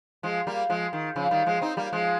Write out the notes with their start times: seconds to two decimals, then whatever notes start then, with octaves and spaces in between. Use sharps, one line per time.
0.23 F3 G#3
0.47 G3 A#3
0.70 F3 G#3
0.93 D#3
1.16 C#3 F3
1.31 D#3 G3
1.46 F3 G#3
1.61 C4 D#4
1.77 G3 A#3
1.93 F3 G#3